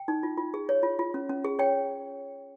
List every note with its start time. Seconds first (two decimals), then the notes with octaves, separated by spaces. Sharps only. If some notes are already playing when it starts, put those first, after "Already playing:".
Already playing: G5
0.08 D#4
0.23 F4
0.37 F4
0.54 G#4
0.69 C#5
0.83 F4
0.99 F4
1.14 C#4
1.29 C#4
1.44 G#4
1.59 C#5 G5